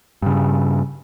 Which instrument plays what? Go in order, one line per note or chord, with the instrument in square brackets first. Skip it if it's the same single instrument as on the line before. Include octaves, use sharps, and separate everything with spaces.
[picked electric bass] G2 C#3